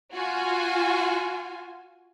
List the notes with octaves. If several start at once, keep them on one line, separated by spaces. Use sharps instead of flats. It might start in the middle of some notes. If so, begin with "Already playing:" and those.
F4 F#4 G#5